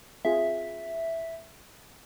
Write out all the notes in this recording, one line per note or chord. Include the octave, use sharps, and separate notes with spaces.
C4 F4 G#4 E5